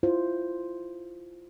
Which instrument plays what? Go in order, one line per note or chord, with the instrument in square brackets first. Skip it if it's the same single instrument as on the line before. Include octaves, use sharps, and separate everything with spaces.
[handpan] E4 F4 C5